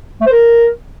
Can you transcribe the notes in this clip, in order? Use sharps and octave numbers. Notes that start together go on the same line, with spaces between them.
A3
C5
A#4